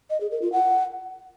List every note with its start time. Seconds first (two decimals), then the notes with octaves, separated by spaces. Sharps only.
0.10 D#5
0.21 G#4
0.31 A#4
0.42 F4
0.52 F#5